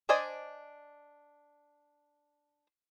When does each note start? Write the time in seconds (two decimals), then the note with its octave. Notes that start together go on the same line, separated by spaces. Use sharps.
0.09 D4 C5 D5 D#5 G#5